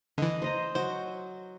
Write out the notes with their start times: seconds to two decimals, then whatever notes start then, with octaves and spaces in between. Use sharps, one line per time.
0.18 D3 E3 D#5
0.42 C5 D#5 A#5
0.75 F#3 F#4 C5